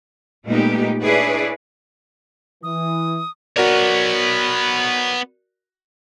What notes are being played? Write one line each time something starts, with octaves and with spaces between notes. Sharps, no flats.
A#2 G#3 A3 B3 D#4 G4
D4 E4 G#4 B4 C#5 D5
E3 D#6
B3 F#4 A#4 C#5 D5